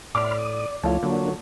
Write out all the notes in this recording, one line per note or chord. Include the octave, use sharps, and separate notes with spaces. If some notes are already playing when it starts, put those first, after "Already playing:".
A2 D5 B5 C6 D6 F6
D#6
C#2 F3 A3 E4 F4 C#5 A5
D3 F#3 A#3 D4